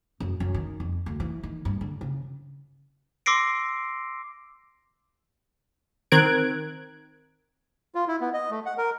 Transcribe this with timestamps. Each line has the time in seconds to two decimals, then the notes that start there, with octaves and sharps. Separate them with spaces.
0.20 F#2
0.40 F#2
0.54 D#3
0.80 F2
1.06 D2
1.20 E3
1.43 D#3
1.65 G2
1.81 D3
2.01 C#3
3.26 C6 D6 E6 A#6 C7 D7
6.12 D#3 C4 A#4 F#6 G#6 D7
7.95 F4
8.08 E4
8.21 B3
8.34 D#5
8.51 A3
8.66 F#5
8.78 A#4